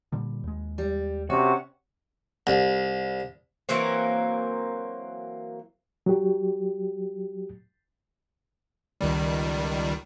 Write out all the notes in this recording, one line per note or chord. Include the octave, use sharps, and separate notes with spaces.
A#2 D3 G3
D#2 G#3
G3
C3 C#4 F#4
C2
E3 F#3 A#3 C4
F#3 G4
C#2 D#3 G3